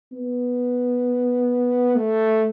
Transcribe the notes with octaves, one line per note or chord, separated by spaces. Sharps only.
B3
A3